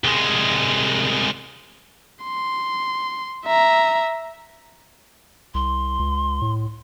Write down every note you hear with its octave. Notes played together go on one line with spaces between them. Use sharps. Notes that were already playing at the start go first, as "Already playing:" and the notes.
C2 G#3
C6
E5 A#5
C2 C6
C#2
A2